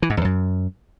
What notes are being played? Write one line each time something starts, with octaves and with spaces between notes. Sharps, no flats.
E3
G#2
E2
F#2